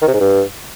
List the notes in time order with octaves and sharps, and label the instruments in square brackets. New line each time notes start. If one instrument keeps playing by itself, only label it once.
[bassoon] D#3
C3
G#2
G2